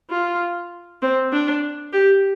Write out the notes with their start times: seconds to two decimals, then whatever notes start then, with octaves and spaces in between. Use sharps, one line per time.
0.10 F4
1.02 C4
1.32 D4
1.93 G4